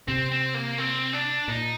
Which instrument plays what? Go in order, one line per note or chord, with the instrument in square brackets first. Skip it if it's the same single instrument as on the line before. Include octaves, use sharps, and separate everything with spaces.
[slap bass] C3 [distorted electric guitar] C4
[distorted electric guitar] C4
A#3
C4
D4
[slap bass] A#2 [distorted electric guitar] D#4